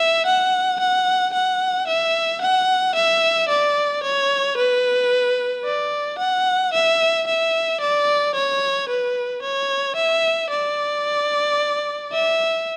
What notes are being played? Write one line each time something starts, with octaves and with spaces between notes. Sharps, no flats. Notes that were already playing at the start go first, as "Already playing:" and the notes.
Already playing: E5
F#5
F#5
F#5
E5
F#5
E5
D5
C#5
B4
D5
F#5
E5
E5
D5
C#5
B4
C#5
E5
D5
E5